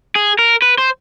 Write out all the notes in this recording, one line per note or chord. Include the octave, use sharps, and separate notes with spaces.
G#4
A#4
B4
C5